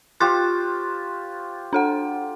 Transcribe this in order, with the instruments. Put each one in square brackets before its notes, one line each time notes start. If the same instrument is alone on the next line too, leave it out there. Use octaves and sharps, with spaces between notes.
[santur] F4 G4 C5 [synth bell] C#6 F#6 A6
[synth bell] D4 A4 F#5